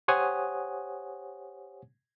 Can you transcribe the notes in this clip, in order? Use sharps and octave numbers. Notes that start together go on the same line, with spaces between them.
G4 C5 C#5 F#5 G#5 D#6